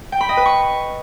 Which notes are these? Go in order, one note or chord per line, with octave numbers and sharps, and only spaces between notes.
G5
B5
D#5
B4
C#6